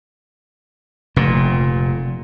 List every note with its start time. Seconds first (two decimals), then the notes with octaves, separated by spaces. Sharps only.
1.16 F1 A#2